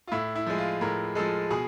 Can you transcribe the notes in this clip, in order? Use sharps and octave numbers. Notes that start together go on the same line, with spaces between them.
F4
A2 E4
E4
F3 G#3
F4
A2 A#4
F3 G#3 A4
B2 G#4